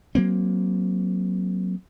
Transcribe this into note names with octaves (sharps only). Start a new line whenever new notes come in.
F#3 A#3 C4